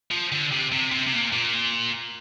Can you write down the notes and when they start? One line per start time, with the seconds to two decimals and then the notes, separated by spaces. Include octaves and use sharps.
0.11 F3
0.32 D3
0.52 C3
0.72 C3
0.92 C3
1.07 C3
1.13 A#2
1.33 A#2